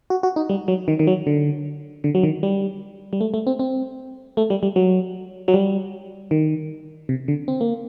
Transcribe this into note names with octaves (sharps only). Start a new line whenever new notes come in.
F#4
F#4
D#4
G3
F#3
D#3
D#3
F#3
D3
D3
F#3
D#3
G3
G3
A3
A3
C4
C4
A3
G3
G3
F#3
F#3
G3
D#3
C3
D3
C4
A#3